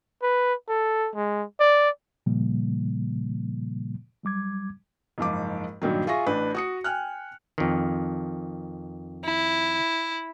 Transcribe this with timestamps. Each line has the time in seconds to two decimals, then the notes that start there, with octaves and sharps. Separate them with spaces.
0.22 B4
0.68 A4
1.15 G#3
1.60 D5
2.26 A#2 C#3 F3 G3 A#3
4.23 F#3 G3 D6 G#6
5.18 F#1 G#2 F3 D6
5.82 G2 A#2 D#3 F#3
6.07 F4 G#4 E5 C#6 A#6
6.26 A1 D4 B4
6.55 F#4 D#6 C#7
6.84 G5 G#5 F6 F#6
7.58 F2 D#3
9.25 E4